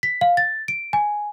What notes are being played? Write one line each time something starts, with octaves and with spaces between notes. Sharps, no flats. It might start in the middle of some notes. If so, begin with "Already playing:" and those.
B6
F5
A6
D7
G#5